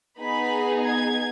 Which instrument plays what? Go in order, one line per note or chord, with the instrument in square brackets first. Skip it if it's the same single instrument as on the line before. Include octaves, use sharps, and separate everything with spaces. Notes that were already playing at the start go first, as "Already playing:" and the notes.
[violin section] B3 D#4 G#4 B5
G#6